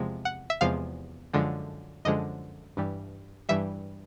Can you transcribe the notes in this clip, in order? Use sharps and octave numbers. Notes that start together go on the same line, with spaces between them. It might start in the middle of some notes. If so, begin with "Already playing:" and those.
Already playing: E2 C3 F3 G#3
F#5
E5
E2 C3 F3 G#3 F5
F#2 D3 F3 G#3
F#2 D3 F3 G#3 D#5
G2 E3 G3
G2 E3 G3 E5